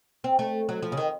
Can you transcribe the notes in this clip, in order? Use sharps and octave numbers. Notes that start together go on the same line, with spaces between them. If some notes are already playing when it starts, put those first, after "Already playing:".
C4
A3
F#3
F3
C#3
D#3